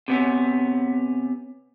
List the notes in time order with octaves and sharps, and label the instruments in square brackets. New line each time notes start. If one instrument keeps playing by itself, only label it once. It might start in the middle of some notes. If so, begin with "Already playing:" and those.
[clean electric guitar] C3 B3 C#4